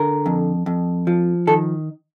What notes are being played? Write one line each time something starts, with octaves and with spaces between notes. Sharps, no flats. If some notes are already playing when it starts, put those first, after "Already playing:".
Already playing: D3 A#4
F2
F2
F3
D#3 A4